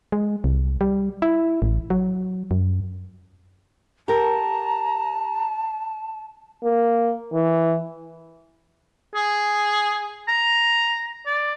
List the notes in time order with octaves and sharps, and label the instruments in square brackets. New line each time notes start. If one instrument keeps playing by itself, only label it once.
[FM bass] G#3
C2
G3
E4
A1
F#3
F#2
[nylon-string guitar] G4 A#4 [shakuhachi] A5 [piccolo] A#5
[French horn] A#3
E3
[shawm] G#4
A#5
D5